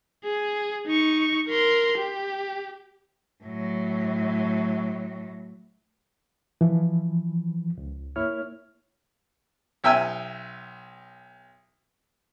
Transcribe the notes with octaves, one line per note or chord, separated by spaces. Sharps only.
G#4
D#4 C#6
A#4 C6
G4
A2 F#3
E3 F3
C#2
A#3 E4 C#5 F6
B1 E5 G5 G#5 E6